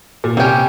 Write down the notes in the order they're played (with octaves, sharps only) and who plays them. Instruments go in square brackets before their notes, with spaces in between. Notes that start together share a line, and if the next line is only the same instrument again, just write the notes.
[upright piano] A#2
[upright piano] C3 [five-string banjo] G3 C#4 G4